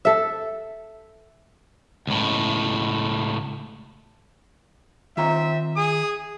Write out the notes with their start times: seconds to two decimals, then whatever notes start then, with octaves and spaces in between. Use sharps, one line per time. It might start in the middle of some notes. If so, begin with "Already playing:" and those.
0.05 A4 E5
2.07 C#2 A2
5.17 D#3 C4 F4 E5 A#5
5.76 G#4 D#6